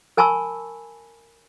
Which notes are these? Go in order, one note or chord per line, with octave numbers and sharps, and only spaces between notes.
A#4 G#5 A5 B5 C#6 E6